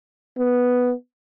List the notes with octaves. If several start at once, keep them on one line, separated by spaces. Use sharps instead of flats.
B3